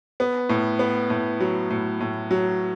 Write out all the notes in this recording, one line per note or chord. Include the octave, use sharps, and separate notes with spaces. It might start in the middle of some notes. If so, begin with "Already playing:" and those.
B3
A2
B3
A2
F#3
A2
A2
F#3